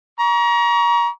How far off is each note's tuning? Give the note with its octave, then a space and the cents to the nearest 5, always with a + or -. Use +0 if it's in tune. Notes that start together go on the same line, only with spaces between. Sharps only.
A#5 +30 C#6 +35